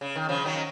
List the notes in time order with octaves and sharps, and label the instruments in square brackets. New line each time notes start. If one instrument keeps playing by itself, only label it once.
[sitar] C#3
D#3
C#3 F3
D#3 F#3